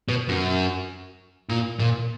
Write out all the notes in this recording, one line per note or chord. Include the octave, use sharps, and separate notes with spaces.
B2
F#2
A#2
A#2